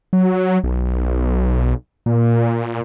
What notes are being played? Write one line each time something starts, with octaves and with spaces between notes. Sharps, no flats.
F#3
B1
A#2